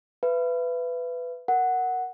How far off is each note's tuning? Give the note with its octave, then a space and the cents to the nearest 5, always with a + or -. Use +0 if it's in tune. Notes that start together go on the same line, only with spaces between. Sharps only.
B4 +15 E5 +35
A#4 +0 F#5 +0